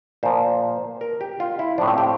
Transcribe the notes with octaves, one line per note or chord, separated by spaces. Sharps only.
A#2 F3 C5
A#4
G4
F4
E4
A2 F3 D4
C4
G4